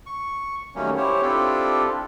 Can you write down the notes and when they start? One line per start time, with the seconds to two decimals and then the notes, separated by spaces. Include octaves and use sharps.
0.06 C#6
0.75 D#3 F#3 G3 A3 A#3 C#4
0.97 E4 G4 C5 C#5
1.22 C4 D4 E4 F4 G4 A4